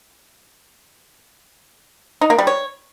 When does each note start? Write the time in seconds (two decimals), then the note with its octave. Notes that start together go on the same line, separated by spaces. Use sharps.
2.21 D#4
2.30 A#3
2.38 G3
2.47 C#5